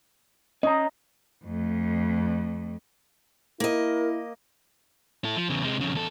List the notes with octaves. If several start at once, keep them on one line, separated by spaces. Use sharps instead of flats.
C#4 D#5 A#5
F2 A3
A#3 E4 A#4 D#5
E4 A4
F3
E2 C#3
C3 G#3
F2 C#3
E2 A4